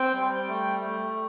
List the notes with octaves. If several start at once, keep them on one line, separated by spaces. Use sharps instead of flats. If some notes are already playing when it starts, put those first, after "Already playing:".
Already playing: C4 G5
G3
A3
A3